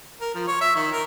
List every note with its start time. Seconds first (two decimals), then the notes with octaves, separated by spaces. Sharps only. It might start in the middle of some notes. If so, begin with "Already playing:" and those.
0.20 A#4
0.35 F3
0.47 C#5
0.61 E5
0.75 D#3
0.92 A#4